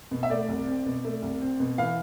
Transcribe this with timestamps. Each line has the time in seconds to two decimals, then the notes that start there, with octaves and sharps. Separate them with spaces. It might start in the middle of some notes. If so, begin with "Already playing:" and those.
0.11 B2
0.23 E5
0.30 A3 D5
0.48 C2
0.67 C4
0.86 B2
1.04 A3
1.22 C2
1.41 C4
1.60 B2
1.78 E3 F5